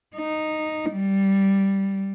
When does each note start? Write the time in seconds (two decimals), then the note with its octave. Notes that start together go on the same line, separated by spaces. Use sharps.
0.16 D#4
0.91 G3